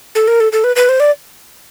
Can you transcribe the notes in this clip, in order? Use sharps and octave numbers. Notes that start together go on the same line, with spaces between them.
A4
A#4
A4
A4
B4
B4
C5
D5